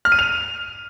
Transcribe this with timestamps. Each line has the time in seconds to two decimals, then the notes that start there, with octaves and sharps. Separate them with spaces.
0.05 F6
0.12 D#7
0.19 F7